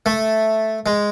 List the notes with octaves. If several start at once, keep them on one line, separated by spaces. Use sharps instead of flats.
A3
G#3